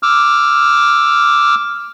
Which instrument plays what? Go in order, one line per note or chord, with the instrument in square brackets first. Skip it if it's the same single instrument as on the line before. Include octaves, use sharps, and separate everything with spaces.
[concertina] D6 E6 F6